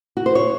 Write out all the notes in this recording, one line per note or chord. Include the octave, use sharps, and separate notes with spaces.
F#4
C5
C#5